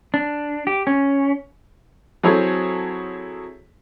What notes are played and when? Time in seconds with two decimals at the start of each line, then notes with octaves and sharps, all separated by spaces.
0.14 D4
0.67 G4
0.87 C#4
2.23 F#3 C4 E4 G#4 A4 C#5